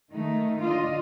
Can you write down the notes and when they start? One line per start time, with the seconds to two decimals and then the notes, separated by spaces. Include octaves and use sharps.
0.12 D#3 A3 D#4
0.63 D3 F4 D5 D#5